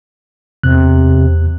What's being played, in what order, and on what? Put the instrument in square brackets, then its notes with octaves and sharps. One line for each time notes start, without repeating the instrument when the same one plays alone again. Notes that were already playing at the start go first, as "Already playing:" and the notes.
[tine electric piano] E2 F#6 [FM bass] C3